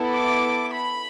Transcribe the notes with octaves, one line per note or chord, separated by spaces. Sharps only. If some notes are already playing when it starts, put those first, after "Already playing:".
Already playing: B3 E4 A4
D6
B5